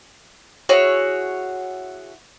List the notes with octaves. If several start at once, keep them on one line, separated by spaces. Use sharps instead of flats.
E4 F#4 G#4 C#5